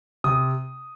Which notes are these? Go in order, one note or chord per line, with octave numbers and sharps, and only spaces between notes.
C3 D#6